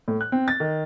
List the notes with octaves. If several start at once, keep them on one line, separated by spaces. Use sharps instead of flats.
A2
F#6
C4
A6
D#3